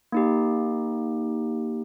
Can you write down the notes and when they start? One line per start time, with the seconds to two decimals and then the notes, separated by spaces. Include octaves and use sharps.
0.12 A#3 D#4 G4